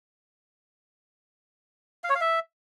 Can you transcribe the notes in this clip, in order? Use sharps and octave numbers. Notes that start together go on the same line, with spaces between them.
F5
C#5
F5
E5